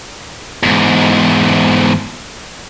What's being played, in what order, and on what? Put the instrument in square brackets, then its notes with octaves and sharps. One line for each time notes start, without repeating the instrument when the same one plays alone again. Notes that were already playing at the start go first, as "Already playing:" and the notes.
[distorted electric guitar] E2 G#2